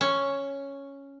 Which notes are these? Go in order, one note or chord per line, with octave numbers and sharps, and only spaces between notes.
C#4